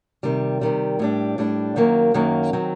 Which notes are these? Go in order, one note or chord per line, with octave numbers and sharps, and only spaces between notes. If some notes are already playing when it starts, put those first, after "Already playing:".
C3 D#3 G3
C3 D#3 G3
A2 G3 D4
A2 G3 D4
F#2 D#3 F#3 A#3
F#2 D#3 F#3 A#3
D#3 F#3 C4